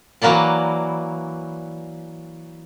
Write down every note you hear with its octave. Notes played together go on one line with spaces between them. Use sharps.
E3 F#3 A#3 D5 A5